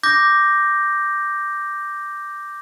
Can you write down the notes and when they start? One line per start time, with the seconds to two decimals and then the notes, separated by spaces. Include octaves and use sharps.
0.03 D6 G6 A#6